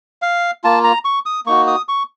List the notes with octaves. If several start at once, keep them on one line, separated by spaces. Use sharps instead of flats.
F5
A#3 F4 A5
A#5
C#6
D#6
A#3 D#4 F#4 C#6
D#6
C#6